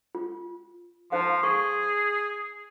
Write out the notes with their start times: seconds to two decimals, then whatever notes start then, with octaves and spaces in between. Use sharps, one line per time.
0.15 F4
1.12 F3 D#4 C5 F5
1.43 G#4 C#6